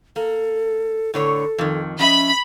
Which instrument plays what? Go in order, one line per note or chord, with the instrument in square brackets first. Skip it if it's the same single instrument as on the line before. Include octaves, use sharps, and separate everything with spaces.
[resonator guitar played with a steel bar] A#3 [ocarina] A4
[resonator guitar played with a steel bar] A2 D3 C#5 [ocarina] A4
[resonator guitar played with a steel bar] F2 D#3
[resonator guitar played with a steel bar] F3 D#5 E5 [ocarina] C#4 [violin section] B5